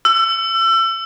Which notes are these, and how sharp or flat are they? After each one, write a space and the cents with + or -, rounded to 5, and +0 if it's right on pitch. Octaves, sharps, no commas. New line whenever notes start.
E6 +30